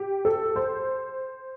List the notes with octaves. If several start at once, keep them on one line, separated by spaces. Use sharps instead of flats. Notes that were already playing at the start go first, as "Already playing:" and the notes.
Already playing: G4
A4
C5